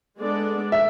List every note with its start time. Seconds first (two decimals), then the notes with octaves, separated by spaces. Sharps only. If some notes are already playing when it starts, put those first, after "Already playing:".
0.20 G#3 B3 D4 A4 D5
0.72 E5